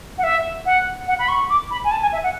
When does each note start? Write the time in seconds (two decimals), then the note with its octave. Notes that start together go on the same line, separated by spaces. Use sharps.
0.18 F#5
0.23 E5
0.66 F#5
1.08 F#5
1.19 B5
1.28 C#6
1.50 D6
1.71 B5
1.84 G#5
1.91 A5
2.02 G#5
2.13 E5
2.23 F#5